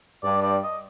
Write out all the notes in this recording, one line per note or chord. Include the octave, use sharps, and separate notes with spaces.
G2 D5
D5
D#5